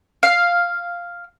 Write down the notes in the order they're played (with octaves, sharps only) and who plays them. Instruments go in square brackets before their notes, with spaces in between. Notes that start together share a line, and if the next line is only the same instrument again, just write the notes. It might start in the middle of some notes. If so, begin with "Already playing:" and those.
[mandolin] F5